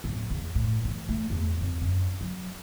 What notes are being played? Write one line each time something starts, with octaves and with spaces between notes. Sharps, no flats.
D1
E2
A2
E3
A3
E2
F2
F#2
F#3